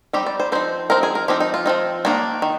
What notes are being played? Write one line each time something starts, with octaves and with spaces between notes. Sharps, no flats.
G3 C4 D#4 G4
D5
C5
F3 C4 D#4 C5
F3 C4 D#4 A#4
G#4
A#4
F3 C4 D#4 G4
D#4
F4
F3 C4 D#4
D#3 A#3 D4 D#4
D#3